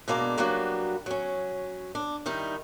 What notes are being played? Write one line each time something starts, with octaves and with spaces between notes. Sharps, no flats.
B2 G#3 A#3 D4 D5 A#5
F#3 G3 A#3 B3 D4 F#4
F#3 C#4
D4
D#3 G3 D#4 E4